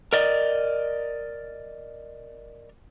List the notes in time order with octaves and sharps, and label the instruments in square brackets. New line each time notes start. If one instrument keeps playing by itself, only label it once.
[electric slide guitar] A#4 D5 D#5